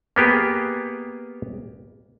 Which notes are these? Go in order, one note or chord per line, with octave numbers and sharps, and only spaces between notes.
A#3 B3 G4 G#4